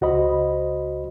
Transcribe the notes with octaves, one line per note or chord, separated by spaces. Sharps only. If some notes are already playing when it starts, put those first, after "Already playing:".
C#2 F#4 C5 D#5 B5